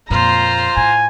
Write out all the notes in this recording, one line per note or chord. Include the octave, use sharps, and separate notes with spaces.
F2 A#2 F4 C5 A#5
A2 G#5